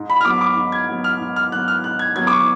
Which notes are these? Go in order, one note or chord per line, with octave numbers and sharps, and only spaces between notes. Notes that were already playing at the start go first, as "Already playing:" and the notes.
Already playing: G#2
B5
F6
F#3 B3 D6
D6
G#2
G#6
F#3 B3
F6
G#2
F6
F#3 B3 F#6
F6
G#2 F#6
G#6
F#3 B3 G#6
D6
C#6